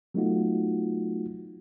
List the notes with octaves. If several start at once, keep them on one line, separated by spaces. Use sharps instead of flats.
F#3 A3 B3 D#4 F4 F#4